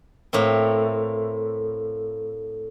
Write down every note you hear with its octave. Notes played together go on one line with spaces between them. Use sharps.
A2 A#3 C4